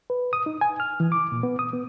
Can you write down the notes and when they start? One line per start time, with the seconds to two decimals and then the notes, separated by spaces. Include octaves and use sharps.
0.10 B4
0.33 D#6
0.46 D#4
0.61 G#5
0.80 F6
1.00 E3
1.12 D6
1.32 A#2
1.43 B3
1.59 D#6
1.73 B3